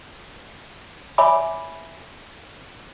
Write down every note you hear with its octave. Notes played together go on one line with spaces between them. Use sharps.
C#5 E5 G#5 B5 D6